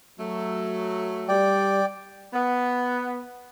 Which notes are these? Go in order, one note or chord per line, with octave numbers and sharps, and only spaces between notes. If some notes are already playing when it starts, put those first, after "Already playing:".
F#3 A3
G3 D5 G5
B3